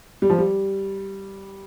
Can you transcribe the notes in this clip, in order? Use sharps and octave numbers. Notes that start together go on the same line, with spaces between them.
G3
F3
G3